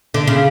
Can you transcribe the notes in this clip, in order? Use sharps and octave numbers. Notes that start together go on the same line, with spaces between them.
D3
C#3